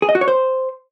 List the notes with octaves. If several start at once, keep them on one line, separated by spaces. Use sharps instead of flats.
G#4
D#5
F#4
C#5
C5